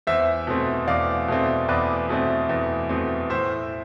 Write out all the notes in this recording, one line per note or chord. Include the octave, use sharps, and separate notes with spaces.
E2 C5 E5
B2 A3 C4
E2 D5 F5
B2 A3 C4
E2 B4 D5
B2 A3 C4
E2
B2 A3 C4
A2 C5 E5